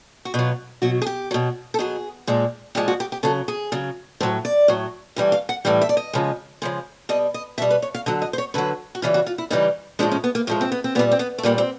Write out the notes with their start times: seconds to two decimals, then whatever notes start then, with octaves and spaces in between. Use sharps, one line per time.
0.25 F#4
0.34 B2 F#3 F4
0.82 B2 F#3 F#4
1.02 G#4
1.06 G4
1.31 B2 F#3
1.74 A4
1.79 B2 F#3 G#4
2.27 A#2 F3 G#3
2.75 A#2 F3 G#3 G4
2.88 F#4
3.00 G4
3.12 G4
3.23 C#3 F#3 A4
3.48 G#4
3.72 C#3 F#3
4.20 A2 F#3 C5
4.45 D5
4.68 A2 F#3
5.16 A2 E3 G3
5.32 F5
5.49 F#5
5.65 A2 E3 G3 F5
5.81 E5
5.89 D5
5.97 D#5
6.13 C#3 F3 G#3
6.62 C#3 F3 G#3
7.09 B2 G3 D#5
7.34 D#5
7.58 B2 G3 E5
7.70 B4
7.82 C#5
7.94 F5
8.06 D3 F#3 D#5
8.22 D#5
8.33 C5
8.38 C#5
8.54 D3 F#3 B4
8.95 F#4
9.02 C#3 E3 G3 F4
9.14 F#4
9.26 F4
9.38 E4
9.50 C#3 E3 G3 D#4
9.99 A2 F3 G#3 D4
10.12 C#4
10.24 B3
10.35 A#3
10.47 A2 F3 G#3 A#3
10.61 C4
10.72 B3
10.84 C4
10.95 A#2 B3
10.99 G3
11.11 C4
11.19 B3
11.38 A3
11.43 A#2 G3 A#3
11.58 C4